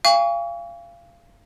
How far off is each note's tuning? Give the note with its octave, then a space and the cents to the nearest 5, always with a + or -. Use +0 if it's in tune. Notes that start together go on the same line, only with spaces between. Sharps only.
F5 -25 G#5 -45 C#6 +35